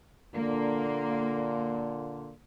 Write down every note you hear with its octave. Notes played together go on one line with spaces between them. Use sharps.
A#2 D3 A#3